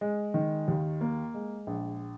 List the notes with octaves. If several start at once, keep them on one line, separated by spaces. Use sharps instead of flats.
G#3
D#3
D#2
A#3
G#3
A#1